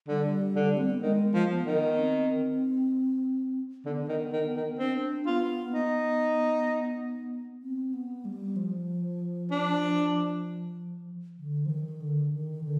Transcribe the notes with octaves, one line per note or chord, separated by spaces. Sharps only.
D3 G3
D3
C4
B3
D#3 G#3
F3
B3
D#3
C4
D3 B3
D#3
D#3
D#3
C4 D4
B3 F4
B3 D#4
C4
B3
G3
F3
D4
D3
F3
D#3
D3
D#3
D3